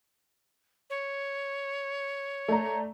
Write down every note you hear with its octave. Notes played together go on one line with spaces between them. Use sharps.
C#5
A3 D5 A#5